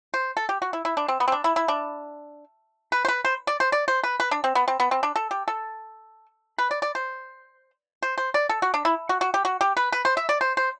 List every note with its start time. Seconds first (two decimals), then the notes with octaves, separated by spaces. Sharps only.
0.14 C5
0.37 A4
0.49 G4
0.62 F#4
0.73 E4
0.85 E4
0.97 D4
1.08 C4
1.20 B3
1.28 C4
1.32 D4
1.44 E4
1.56 E4
1.68 D4
2.92 B4
3.05 C5
3.08 B4
3.25 C5
3.47 D5
3.60 C5
3.72 D5
3.88 C5
4.04 B4
4.20 B4
4.31 D4
4.44 C4
4.55 B3
4.68 C4
4.80 B3
4.91 C4
5.03 D4
5.16 A4
5.31 G4
5.48 A4
6.58 B4
6.71 D5
6.82 D5
6.95 C5
8.02 C5
8.18 C5
8.34 D5
8.49 A4
8.62 F#4
8.74 D4
8.85 E4
9.09 F#4
9.21 F#4
9.34 G4
9.45 F#4
9.61 G4
9.77 B4
9.92 B4
10.05 C5
10.17 E5
10.29 D5
10.41 C5
10.57 C5